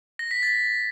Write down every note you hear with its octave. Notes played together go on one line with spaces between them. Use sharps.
A#6
B6
A6